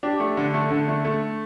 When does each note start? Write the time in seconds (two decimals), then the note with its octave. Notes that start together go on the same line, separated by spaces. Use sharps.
0.03 D4 G4
0.20 A3
0.37 D3
0.54 A3
0.70 D3
0.88 A3
1.05 A3